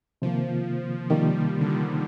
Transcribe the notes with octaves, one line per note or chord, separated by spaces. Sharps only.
C3 D#3 F3 A#3
C3 D#3 G3 A#3
F3
D3
D#3